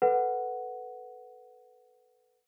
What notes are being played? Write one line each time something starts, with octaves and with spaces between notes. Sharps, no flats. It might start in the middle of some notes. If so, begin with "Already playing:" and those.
A4 B4 F#5